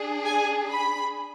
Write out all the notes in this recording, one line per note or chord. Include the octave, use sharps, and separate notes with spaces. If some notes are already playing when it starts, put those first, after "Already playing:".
Already playing: D4 G#4
G#5
B5